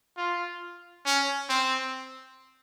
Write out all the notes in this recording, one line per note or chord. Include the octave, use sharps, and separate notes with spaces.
F4
C#4
C4